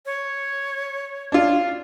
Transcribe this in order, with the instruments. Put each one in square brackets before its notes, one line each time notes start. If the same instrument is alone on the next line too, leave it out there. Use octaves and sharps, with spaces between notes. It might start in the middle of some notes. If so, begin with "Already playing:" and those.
[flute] C#5
[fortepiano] D4 F4